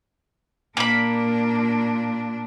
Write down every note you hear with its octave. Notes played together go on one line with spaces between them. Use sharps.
A#2 A#3 D4 B5